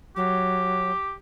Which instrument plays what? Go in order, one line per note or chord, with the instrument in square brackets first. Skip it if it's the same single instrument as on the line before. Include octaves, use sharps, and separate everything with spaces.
[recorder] F#3 [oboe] G4